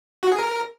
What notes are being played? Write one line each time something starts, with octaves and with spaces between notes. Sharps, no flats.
F#4
G#4
A#4